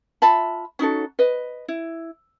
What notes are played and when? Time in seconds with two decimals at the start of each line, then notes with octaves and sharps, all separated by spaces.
0.22 F4 E5 A5 B5
0.79 C#4 D#4 F#4 A4
1.19 B4 D#5
1.68 E4